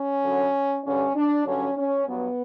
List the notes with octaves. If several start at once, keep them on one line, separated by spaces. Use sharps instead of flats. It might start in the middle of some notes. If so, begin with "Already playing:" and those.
Already playing: C#4
F#2 D3 F#3
G2 D3 G3 C#4
D4
G2 D3 F#3 C#4
C#4
G2 F#3 B3